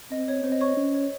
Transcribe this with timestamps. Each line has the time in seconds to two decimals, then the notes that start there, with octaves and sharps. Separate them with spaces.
0.11 C4 D#5
0.28 C#5
0.44 C4 C5
0.52 D#5
0.61 C#5 C#6
0.68 D#5
0.77 C#4 C#5
0.94 C#5